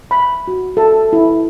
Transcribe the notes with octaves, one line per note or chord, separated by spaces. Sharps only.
B5
F#4
A4
E4